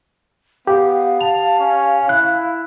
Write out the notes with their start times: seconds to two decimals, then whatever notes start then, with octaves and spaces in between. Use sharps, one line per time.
0.67 B3 G4 F5
1.21 A5 F7
1.59 C#4
2.09 E4 F#6